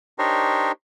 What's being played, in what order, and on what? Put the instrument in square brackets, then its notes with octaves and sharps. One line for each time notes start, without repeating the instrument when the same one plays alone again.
[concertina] D4 D#4 G4 A#4 C5 C#5